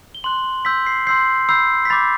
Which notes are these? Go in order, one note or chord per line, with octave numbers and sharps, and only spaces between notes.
G7
C6 F#6 F#7
C6 E6 G6 B6
C7
C6 E6 G6 C7
B5 E6 G6 C7
B6
B5 D6 G6 A6